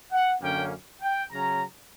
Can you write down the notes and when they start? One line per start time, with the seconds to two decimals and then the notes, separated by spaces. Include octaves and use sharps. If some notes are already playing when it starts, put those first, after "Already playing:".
0.12 F#5
0.42 F#2 D3 A#3 C#4 G5
1.02 G5
1.32 C#3 F#3 C#4 A#5